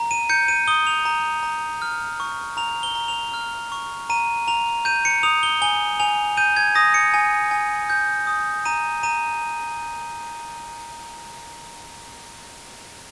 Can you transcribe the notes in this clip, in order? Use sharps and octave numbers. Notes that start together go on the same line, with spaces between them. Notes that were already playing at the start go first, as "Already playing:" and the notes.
Already playing: A#5
D#7
G6 C#7
D#7
D#6 G7
F7
A#5
A#5
F6
C#6
A#5 F7
G7
A#5
F7
F6
C#6
A#5 D#7
A#5 F7
G6 D#7
C#7
D#6 F7
G7
G#5 G7
G#5 F7
G6 D#7
G#6
D#6 A#6
C#7
G#5
G#5
G6
D#6
A#5 D#7
A#5 D#7